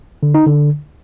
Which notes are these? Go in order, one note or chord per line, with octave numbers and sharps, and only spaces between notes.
D3
D#4
D3